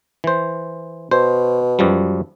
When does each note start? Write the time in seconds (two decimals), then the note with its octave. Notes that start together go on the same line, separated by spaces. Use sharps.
0.24 E3 C5
1.11 B2 C5
1.79 F#2 F3 G3